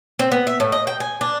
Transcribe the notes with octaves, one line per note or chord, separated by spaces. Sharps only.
C4
B3
E5
A2
D#5
G5
G#5
D4